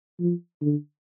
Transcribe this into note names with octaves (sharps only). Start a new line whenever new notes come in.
F3
D3